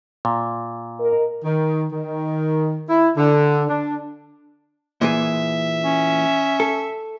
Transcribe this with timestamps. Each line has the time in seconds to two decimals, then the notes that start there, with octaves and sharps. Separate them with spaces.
0.25 A#2
0.99 A#4 D#5
1.45 D#3
1.92 D#3
2.89 E4
3.17 D3
3.69 D4
5.01 A#2 E3 G#4 E5
5.83 C#4
6.60 A4